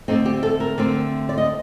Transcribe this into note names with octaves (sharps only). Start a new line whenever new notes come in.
D3 A3 C4 D#4
G4
A4
A#4
D3 A3 C4
D5
D#5